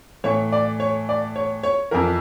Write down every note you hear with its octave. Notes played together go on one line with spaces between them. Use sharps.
A2 E3 C#5
D5
C#5
D5
C#5
C#5
F2 E3 A#4